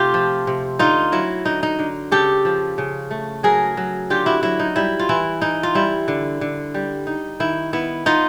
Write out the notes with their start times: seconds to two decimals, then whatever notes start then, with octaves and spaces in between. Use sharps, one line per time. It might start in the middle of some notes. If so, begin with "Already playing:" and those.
Already playing: C3 A3 F4 G4
0.14 F3
0.47 C3
0.79 D3 D#4 F4
1.12 F#3 E4
1.45 D3 D#4
1.63 D#4
1.79 D3
2.12 C#3 G4 A4
2.45 F3
2.78 C#3
3.11 A3
3.43 F#3 G#4 A#4
3.77 F#3
4.10 D3 F4 G4
4.26 E4 F#4
4.43 F#3 E4
4.59 D#4
4.76 G3 E4
4.99 F4
5.09 E3 E4
5.42 E3 D#4
5.63 F4
5.75 G3 E4
6.08 D3
6.41 D3
6.74 G3
7.07 D#4
7.40 D#3 E4
7.73 B3 E4
8.06 B3 D#4 F4